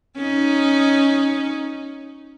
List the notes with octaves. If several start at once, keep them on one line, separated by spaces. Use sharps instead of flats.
C#4 D#4